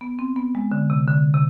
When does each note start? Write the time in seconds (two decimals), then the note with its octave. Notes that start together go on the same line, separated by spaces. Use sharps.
0.01 B3
0.19 C4
0.36 B3
0.55 G#3
0.72 D3
0.90 C3
1.08 D3
1.34 C3